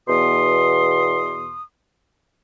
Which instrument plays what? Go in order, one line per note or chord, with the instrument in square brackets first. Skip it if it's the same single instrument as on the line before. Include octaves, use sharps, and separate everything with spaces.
[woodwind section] E2 B2 C6 D#6